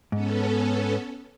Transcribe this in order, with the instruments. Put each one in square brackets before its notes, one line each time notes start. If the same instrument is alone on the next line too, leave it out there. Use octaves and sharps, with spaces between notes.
[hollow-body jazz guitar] G#2 [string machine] B3 C#4 A4